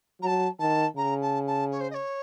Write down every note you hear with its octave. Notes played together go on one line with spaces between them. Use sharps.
F#3 A5 A#5
D#3 A5
C#3 A#5
A5
A5
C#5
C5
D#5
C#5